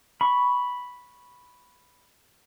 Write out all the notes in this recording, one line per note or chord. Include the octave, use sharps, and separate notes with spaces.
B5 C#6